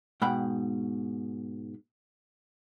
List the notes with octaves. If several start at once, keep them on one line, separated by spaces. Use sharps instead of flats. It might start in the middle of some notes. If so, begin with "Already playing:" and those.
G#2 B2 F#5 G5 B5